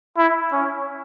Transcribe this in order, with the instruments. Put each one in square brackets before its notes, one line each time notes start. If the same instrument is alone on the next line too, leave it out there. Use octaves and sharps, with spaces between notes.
[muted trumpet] E4
C#4